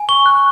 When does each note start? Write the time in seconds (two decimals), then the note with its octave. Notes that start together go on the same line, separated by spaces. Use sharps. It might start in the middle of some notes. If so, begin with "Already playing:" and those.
Already playing: G#5
0.09 C#6 G7
0.26 F#6